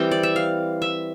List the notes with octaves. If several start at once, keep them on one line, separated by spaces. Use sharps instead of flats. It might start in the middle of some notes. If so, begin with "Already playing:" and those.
Already playing: E3 G3 C4 G5
D5
E5
F5
E5